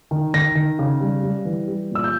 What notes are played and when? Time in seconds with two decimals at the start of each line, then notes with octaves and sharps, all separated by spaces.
0.11 D#3
0.34 D#3 A#6
0.55 D#3
0.79 C#3
1.00 G3
1.23 G3
1.45 E3
1.68 G3
1.91 A#2 E6
2.04 G6